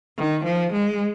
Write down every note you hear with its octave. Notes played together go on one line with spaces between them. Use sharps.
D#3
F3
G#3